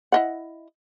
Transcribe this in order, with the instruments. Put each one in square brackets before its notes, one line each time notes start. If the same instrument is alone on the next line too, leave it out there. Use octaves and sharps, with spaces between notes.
[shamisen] E4 D#5 F#5